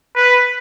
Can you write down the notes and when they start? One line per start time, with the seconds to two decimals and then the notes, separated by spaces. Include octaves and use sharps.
0.16 B4